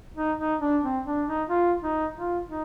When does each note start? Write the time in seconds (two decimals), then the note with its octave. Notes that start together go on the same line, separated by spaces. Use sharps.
0.16 D#4
0.39 D#4
0.61 D4
0.83 C4
1.05 D4
1.28 D#4
1.49 F4
1.83 D#4
2.15 F4
2.49 D#4